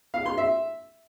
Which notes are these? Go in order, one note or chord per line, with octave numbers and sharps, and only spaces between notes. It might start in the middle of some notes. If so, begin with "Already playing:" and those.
F5
C6
E5